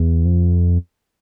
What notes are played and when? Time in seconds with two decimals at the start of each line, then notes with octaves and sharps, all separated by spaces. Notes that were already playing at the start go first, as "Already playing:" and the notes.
Already playing: E2
0.25 F2